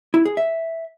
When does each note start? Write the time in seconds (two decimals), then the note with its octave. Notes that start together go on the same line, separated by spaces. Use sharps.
0.14 E4
0.25 G#4
0.37 E5